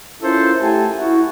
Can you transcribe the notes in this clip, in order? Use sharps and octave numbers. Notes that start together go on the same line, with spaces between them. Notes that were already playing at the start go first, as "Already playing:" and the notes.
C#4 E4 F4 A4 A#4 C5
A3 E4 G4 G#5 A5
E4 F#4